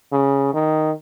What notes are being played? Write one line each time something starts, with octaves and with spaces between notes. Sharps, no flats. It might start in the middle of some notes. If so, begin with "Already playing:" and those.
C#3
D#3